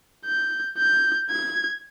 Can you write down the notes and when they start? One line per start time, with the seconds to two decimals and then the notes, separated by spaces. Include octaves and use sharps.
0.26 G6
0.78 G6
1.30 G#6